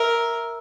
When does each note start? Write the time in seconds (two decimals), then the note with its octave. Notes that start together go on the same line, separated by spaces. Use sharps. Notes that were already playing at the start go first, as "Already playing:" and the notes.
Already playing: A#4 E5